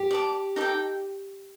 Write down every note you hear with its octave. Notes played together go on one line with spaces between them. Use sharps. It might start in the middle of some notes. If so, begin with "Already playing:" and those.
Already playing: G4
D5 A5 D6
D#4 A4 D5 G5